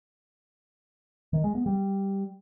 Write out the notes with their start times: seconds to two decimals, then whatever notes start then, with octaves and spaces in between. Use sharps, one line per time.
1.33 D#3
1.44 G#3
1.55 B3
1.66 G3